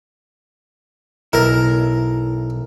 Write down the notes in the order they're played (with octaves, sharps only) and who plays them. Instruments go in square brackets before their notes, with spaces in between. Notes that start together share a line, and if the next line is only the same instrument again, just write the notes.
[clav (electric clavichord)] B1 [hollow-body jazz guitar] E4 [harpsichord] A#4